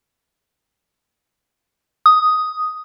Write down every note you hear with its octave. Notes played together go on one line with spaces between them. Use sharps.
D#6